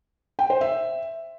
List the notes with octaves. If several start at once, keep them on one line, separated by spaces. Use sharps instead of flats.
G5
C5
E5